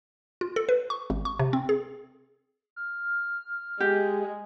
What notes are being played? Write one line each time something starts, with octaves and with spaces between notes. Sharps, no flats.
F4
A4
B4
C#6
G#1
C#6
C3
C4
G#4
F6
G#3 G4